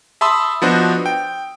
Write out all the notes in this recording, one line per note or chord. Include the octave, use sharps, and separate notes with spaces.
E5 A5 B5 C6 D#6 E6
F3 B3 D4 F#4 C5 D#5
G5